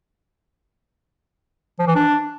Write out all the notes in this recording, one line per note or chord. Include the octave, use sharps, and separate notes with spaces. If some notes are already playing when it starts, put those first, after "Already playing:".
F3
E3
D4